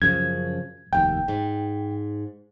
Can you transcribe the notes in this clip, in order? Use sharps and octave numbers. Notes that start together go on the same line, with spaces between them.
F#2 C#3 F3 G#6
F1 D#2 G5
G#2